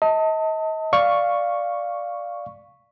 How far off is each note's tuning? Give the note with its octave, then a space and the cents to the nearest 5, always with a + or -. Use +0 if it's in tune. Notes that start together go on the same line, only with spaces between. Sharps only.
D#5 +35 A5 +25
D5 +0 F5 +0 C#6 +0